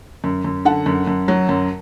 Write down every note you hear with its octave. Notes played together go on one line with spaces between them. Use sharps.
F#2
F#2
D3 F#5 A5
F#2
F#2
F#3
F#2